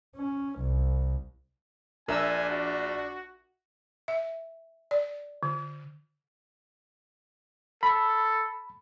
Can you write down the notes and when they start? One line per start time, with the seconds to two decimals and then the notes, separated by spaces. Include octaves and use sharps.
0.16 C#4
0.59 C2
2.08 A#1 D4 A#4 E5 G#5 E6
2.49 F#4
4.08 E5
4.91 D5
5.43 D3
7.83 A4 B5